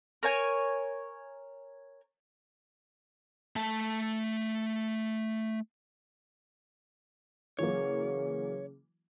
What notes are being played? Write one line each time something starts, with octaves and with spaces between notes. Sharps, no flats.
A#4 C#5 G#5
A3 A5
C#3 E3 F#3 A#3 C#5